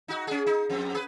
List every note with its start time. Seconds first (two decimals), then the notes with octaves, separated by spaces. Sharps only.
0.08 D#4 F#4
0.27 C#4 G#4
0.47 D#4
0.70 F2 C4
0.95 G#4 B4